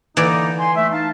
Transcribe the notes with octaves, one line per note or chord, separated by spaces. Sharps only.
D3 E3 A#3 D#4 D5
G#5 C6
A3 E5
D#4 F5 A5